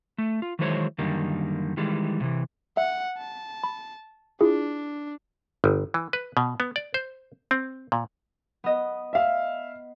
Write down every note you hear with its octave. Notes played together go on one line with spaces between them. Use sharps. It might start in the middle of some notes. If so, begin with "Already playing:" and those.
A3
F4
D#3 E3 F#3 G#3 C5 C#5
F#2 D3 D#3 G3 A#3
D#3 E3 G3 G#3
A2 C3 E3
E5 F#5
A5
B5
D4 E4 F4 G#4
G1
E3
B4
B2
B3
D5
C5
C4
A#2
B3 D#5
E5 F5